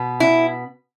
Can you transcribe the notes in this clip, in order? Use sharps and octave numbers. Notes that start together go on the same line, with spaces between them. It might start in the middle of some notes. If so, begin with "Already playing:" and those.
Already playing: B2 B3
E4